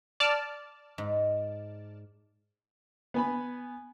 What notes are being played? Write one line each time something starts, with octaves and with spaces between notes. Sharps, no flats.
D5 A5 F6
G#2
B3 G#5 B5